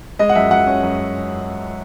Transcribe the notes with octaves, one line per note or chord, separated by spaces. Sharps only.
G#3 D#5
F#5
F#2 E5
F#2 F#5
C#4
F#2